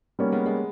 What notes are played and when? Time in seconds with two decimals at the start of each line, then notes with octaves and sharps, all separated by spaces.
0.19 G3 A#3 B3 C#4 D#4
0.32 G#3 B3
0.46 G#3 B3